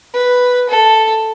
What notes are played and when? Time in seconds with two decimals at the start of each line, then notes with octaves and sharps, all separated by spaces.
0.14 B4
0.69 A4